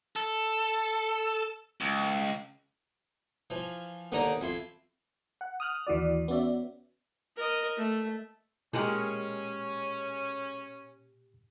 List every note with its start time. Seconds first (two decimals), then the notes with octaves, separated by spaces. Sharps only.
0.16 A4
1.81 C#2
3.50 E3 F3
4.12 D#2 D3 E3 D#4 D5 A#5
4.41 F2 E4 C6
5.41 F#5
5.60 D#6 F6 F#6
5.87 D#2 E3 F#4 D5
6.28 B3 C#4 F#4 D5 E5
7.37 A#4 D#5
7.78 A3
8.73 A#2 G#3 C#4 G4 A#4 F#5